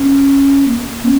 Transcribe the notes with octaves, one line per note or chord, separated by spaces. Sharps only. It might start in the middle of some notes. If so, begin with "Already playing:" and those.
Already playing: C#4
A#3
C#4